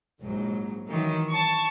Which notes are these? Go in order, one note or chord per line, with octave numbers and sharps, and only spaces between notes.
A#1 G#2 F#3
D#3 E3 F#3
A5 C#6